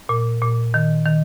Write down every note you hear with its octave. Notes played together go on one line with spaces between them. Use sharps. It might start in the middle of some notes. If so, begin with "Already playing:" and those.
A#2
A#2
D#3
D#3